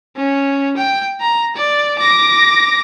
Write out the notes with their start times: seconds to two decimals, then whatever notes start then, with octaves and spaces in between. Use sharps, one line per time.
0.16 C#4
0.77 G5
1.21 A#5
1.56 D5
1.99 D6 A#6